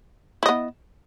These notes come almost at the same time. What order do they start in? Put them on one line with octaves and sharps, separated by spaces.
E4 D#5 B3